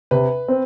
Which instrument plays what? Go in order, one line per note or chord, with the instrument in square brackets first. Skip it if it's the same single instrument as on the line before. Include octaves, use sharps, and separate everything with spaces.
[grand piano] C3 [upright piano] B4
[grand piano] C4